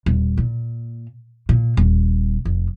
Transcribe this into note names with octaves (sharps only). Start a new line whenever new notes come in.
D#1
A#2
A#2
D#1
F1